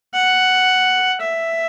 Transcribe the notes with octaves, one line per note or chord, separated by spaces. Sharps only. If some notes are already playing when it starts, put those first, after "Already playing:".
F#5
E5